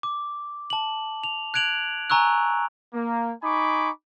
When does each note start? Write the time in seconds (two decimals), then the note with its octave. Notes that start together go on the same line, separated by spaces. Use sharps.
0.03 D6
0.70 A5 F#7
1.24 F7
1.54 F#6 G#6 D7 F7 F#7
2.10 G#5 A#5 C#6 E6 F#6
2.93 A#3
3.43 D#4 G#5 B5 C#6 D6